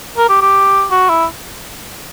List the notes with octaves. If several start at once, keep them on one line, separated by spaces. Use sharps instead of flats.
A#4
G4
G4
F#4
E4